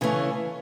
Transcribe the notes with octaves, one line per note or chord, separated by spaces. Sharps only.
C#3 E3 A3 C#4